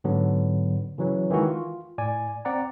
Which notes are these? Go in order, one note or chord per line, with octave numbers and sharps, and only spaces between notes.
G#2 D3 F#3 B3
C#3 E3 F#3
D#3 E3 G#3 F#4
F4
A2 D5 G#5
C4 D5 F#5 A#5